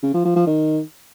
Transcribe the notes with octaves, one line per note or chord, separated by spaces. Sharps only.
C#3
F3
F3
F3
D#3